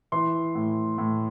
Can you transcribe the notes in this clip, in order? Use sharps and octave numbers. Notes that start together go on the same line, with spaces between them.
E3 C6
A2
A2